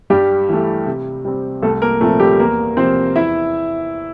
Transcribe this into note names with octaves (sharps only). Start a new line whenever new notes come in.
G2 G3 G4
E3 A3
C3
G3 C4
C2 A3 A4
A#3 A#4
A#2 F3 A3 C4 A4
G3 G4
E2 A#3 A#4
C3 F3 C4 C5
E2 E4 E5